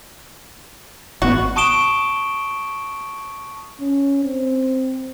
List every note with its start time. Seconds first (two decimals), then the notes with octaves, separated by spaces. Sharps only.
1.22 G#1 B3 F#4
1.56 A5 C#6 D#6 D7 E7 G7
3.80 C#4
4.24 C4